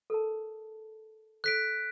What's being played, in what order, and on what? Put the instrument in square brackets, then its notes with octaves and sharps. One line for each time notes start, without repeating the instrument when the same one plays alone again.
[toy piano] A4 A#4 A5
[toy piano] A4 [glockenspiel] F#6 B6 D7